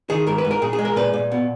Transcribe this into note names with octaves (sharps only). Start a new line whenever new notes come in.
D#3 G#4
G#2 A#4
B4
G#2
A#4
A#2 G#4
G#4
G#3
A#4
A#2 B4
A#2
B2